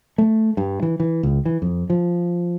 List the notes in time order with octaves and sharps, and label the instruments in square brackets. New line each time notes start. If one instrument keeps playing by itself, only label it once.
[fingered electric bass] A3
G2
E3
E3
C#2
E3
F2
F3